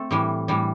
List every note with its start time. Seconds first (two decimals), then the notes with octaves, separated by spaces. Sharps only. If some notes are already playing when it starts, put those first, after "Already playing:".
Already playing: A3 C4 A4
0.11 A2 E3 G3
0.48 A2 E3 G3